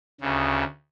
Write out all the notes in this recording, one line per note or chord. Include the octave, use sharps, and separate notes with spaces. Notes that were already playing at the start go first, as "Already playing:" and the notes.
D2 C#3